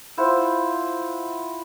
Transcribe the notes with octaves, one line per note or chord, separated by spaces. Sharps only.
E4 F4 C5 F#5